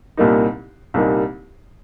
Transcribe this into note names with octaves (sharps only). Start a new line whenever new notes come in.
C2 A#2 G3 A#3 D#4
C2 A#2 G3 A#3 D#4